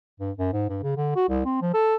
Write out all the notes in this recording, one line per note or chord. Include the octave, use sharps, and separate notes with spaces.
G2
F#2
G#2
G2
C#3
D3
F#4
C2
C4
F3
A4